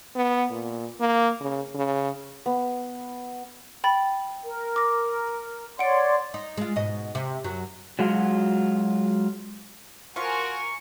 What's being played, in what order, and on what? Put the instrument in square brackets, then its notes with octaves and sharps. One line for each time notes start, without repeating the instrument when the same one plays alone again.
[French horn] B3
A#2
A#3
C#3
C#3
[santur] B3
[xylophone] G5 B5 A6
[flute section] A#4
[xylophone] D6 A#6
[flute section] C#5 D5 C6 [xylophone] F#5 D7
[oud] D#4
G#3 F4
G#2 B2 D#5
C3
F#2 F#3
[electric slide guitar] F#3 G#3 F4 F#4
[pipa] F3 F4 [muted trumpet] F#4 [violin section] A#4 G#5 [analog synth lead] C#6